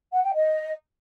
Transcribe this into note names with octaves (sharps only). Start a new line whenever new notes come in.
F#5
G5
D#5